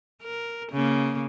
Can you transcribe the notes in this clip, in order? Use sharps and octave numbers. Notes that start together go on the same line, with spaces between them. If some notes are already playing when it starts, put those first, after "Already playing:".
A#4
C#3 A#3